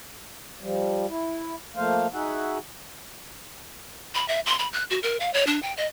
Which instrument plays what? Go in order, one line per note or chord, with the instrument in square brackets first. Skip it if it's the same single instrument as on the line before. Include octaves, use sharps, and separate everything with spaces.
[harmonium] F3 G3
E4
F3 A3 A#3 C5 F5
D#4 F#4 G#4 E5 F#5
[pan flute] B5
E5
C6
B5
F#6
F#4
A#4
F5
C#5
D4
G5
D#5